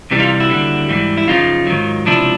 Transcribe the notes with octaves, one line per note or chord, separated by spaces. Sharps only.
C2 C3 E3 G3
D#4 F4
E4 F#4
D#2 D3 G3
G#2 E3 G3
E4
F#2 C#3 F3 D#4 F4
G#2 D#3 F#3
C#2 C3 F3 D4 E4